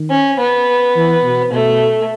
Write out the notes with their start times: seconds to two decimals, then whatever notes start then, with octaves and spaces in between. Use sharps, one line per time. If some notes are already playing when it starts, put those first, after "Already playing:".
Already playing: D#3
0.10 C#4
0.39 B3
0.96 E3
1.23 B2
1.52 B2 A3